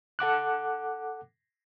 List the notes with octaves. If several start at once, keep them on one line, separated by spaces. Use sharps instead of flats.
A4 F#5 D6 F#6